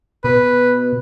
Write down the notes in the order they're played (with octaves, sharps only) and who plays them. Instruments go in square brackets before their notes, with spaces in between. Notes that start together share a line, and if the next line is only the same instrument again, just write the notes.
[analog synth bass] B2 [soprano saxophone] B4